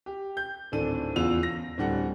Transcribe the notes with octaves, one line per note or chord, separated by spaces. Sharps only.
G4
G6
D1 G#1 D4 A4 D#7
E2 C#3 F4 E6 F7
A#6
D1 D3 G3 F#5